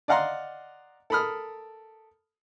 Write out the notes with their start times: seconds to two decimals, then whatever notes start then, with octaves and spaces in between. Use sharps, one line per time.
0.08 D5 D#5 F5 F#5 A#5 C6
1.10 A4 A#4 B5 D#6 F6